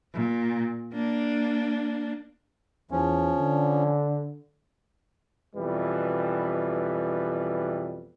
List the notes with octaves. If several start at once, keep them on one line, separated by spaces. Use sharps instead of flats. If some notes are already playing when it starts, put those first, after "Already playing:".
A#2
A#3 D4
E2 F3 C#4
D3
F2 B2 E3 G3 B4